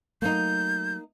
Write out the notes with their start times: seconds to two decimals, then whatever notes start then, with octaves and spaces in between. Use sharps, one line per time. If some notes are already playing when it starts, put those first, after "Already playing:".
0.22 F#3 A3 A#3 D#4 G6